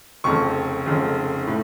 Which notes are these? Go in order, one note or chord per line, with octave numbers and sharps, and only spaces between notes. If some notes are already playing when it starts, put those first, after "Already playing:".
F1 F2 C#3 C#6
F1 F2 C#3
A2